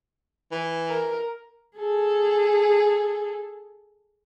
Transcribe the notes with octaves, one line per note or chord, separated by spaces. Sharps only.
E3
A#4
G#4 A4